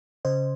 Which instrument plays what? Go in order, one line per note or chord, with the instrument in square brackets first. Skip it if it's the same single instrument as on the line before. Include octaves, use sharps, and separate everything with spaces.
[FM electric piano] C#3 C5 D#5